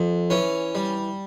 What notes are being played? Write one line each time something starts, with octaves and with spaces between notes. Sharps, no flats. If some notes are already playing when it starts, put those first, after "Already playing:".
Already playing: F2
E3 C#4
G3